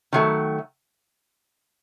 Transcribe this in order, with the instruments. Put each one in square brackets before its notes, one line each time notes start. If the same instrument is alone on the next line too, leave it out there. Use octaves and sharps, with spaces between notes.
[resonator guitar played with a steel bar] D#3 F#3 A3